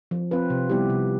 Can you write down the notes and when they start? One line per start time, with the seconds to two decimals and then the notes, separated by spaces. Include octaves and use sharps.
0.11 F3
0.31 C4 F4 B4
0.50 C3
0.70 G3 B3 E4 G4
0.90 C3